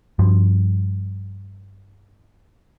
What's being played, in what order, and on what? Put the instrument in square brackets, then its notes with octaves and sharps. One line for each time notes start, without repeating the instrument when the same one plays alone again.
[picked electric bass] G2 F3